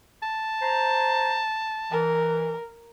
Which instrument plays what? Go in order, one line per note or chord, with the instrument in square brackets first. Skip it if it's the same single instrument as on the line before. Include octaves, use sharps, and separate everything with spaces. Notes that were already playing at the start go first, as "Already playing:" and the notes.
[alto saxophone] A5
[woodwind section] C5 A#5
[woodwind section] E3 [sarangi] A#4